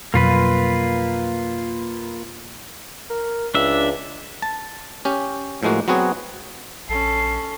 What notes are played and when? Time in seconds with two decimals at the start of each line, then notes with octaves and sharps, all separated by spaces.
0.14 F2 B2 F#3 A#3 F4 B4
3.10 A#4
3.55 C#2 D4 E5
4.42 A5
5.05 C#4 G4
5.63 A2 F3 G#3 A#3 F#4
5.88 F#3 B3 C4 F#4 G#4
6.89 A#1 C#4 A4 C7